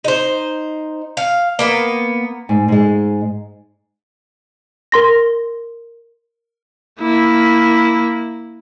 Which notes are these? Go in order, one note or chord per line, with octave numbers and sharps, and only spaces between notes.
D#4 C5
F5
A#3 B3 B4
G#2
G#2 G#3
A#4 C6 A#6
A#3 E4